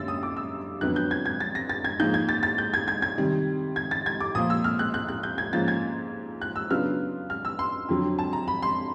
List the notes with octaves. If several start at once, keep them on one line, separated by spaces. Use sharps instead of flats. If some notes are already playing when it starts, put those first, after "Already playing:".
Already playing: F#2 D3 G3 A#3 E6 A6
D#6
D6
E6
F2 D3 F#3 B3 F#6
G6
G#6
G#6
A6
A#6
A6
G#6
G#2 F3 A#3 D#4 G6
G#6
A6
A6
G6
G#6
G#6
G#6
C3 D#3 G3
G#6
A6
G#6
D6
A#2 F3 A#3 D#6
E6
F6
F#6
F#6
F#6
G6
G#6
G#2 F3 A#3 C#4 F4 A6
G#6
F#6
E6
C#3 F#3 B3 D4 F4 F6
F6
E6
C6
F2 D3 F#3
A5
A#5
B5
C6